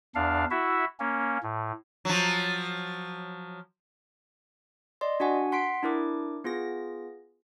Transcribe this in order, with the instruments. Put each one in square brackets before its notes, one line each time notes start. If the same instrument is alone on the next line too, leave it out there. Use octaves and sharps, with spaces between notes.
[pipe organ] E2 D4 F5
E4 F#4 E5
A#3 C#4
A2
[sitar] F3 F#3
[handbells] D5 D#5 C6
D4 F#4 F#5 G#5
F#5 C6 B6 C7 D7
D4 E4 A#4 D6
B3 F4 G#4 A#6